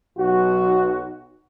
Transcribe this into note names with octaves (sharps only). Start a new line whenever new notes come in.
B1 F#4